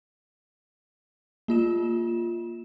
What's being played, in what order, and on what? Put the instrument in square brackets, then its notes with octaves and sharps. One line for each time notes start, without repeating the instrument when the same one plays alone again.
[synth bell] A#3 F4 E7